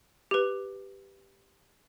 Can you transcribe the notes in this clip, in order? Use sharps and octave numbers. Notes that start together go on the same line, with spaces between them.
G4 B4